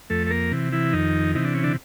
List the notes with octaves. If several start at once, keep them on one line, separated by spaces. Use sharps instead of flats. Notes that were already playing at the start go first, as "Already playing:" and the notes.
F2 A3 A4
A4
A#3 A#4
C3 E3
E3 E4
F2 D#3 D#4
C3 E3 D#4
D4
C#4
D3 D4